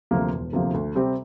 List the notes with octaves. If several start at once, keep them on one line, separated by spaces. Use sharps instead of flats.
D2 C3 F3 A#3
E1
D2 C3 F3 A#3
D2
C3 G3 C4 G4